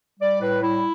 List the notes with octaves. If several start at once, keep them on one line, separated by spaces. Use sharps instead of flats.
G3 D5
A2 B4
G3 E4